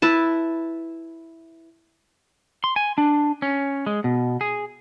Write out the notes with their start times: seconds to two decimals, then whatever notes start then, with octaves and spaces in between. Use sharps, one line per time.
0.02 E4 B4 A5
2.64 C6
2.76 G#5
2.98 D4
3.42 C#4
3.86 G#3
4.04 B2
4.41 G#4